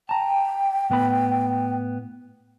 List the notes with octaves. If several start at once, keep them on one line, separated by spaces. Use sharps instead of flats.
G5 A5 A#5
A2 B3 B5